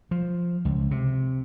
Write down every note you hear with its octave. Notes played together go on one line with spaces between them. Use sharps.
F3
C#2
C3